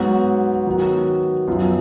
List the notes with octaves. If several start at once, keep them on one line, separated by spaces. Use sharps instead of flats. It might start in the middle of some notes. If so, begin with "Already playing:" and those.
Already playing: G#2 F#3 B3 F#4
D#3 F#3 B3 F#4
F#2 F3 B3 F4